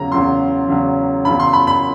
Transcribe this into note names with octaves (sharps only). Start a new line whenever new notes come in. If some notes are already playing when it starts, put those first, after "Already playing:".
Already playing: E2 C#3 F#3 A#5
E2 C#3 F#3 C6
E2 C#3 F#3
E2 C#3 F#3 B5
C6
B5
B5